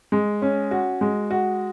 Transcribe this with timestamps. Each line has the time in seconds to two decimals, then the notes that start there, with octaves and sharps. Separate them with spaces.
0.12 G#3
0.42 C#4
0.71 F#4
1.01 G#3
1.30 F#4